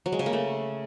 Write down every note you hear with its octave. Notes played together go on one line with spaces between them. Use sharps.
F#3
G#3
C#3
A#3
A3